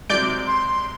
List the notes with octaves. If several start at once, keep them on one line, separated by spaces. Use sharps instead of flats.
C3 F#3 G#3 D5 G6 D7
C6